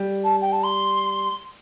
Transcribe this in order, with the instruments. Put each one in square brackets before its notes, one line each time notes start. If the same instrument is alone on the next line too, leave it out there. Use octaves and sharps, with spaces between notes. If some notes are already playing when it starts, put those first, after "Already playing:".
Already playing: [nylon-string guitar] G3
[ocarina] A5
G5
A5
C6